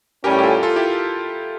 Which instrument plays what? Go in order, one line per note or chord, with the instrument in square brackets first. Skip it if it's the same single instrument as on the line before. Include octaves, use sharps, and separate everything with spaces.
[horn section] A2 G3 C#4 [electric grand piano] G4 A#4
[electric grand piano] G4
F4 A4
F4 A4
E4 G4